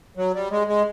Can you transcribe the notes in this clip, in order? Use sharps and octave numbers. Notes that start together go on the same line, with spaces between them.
F#3
G3
G#3
G#3